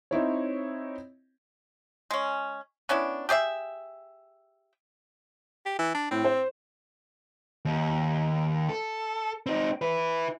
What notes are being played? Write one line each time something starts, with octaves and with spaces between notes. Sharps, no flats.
C4 D#4 E4 C#5
G#3 C#4
B3 C#4 D4 E4
G4 G#4 D5 E5
G4
E3
D4
A2 C4
C5
D#2
A4
C4 D#4
E4 B4